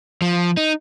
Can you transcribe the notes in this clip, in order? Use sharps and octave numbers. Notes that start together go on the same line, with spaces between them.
F3
D#4